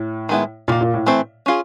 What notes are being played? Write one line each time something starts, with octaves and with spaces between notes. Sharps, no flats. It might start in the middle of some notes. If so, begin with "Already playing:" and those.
Already playing: A2
D#3 G#3 B3 E4
A#2 D#3 G3 A#3
A#2
A2
E3 A3 C4 E4
C#4 F4 G#4